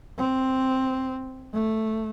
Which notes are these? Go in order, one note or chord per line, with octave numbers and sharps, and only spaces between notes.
C4
A3